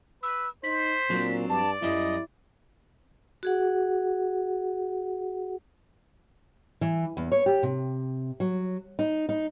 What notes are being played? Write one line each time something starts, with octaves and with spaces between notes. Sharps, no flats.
B4 E6
D#4 C5 B6
A#2 F#3 C4 D4
G2 D5 A5
F#2 G3 E4 D#5
F#4 G#4 F#5
E3
E2
C#5
G4
C3
F#3
D#4
D#4